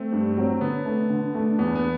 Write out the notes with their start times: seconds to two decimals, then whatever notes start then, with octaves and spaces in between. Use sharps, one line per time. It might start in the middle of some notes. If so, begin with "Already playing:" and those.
Already playing: A3 C4
0.12 G2
0.37 F#3 C4
0.61 D3 B3
0.85 A3 D4
1.10 D3
1.34 A3 D4
1.59 E2 B3
1.75 B3